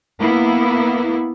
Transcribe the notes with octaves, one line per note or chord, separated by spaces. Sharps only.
A#3 B3 E4